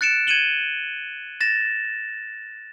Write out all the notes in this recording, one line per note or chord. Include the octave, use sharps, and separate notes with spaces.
F#6 A6 C#7 D7 E7
G#6 C#7 D#7 E7 F#7 G7
A6 A#6 E7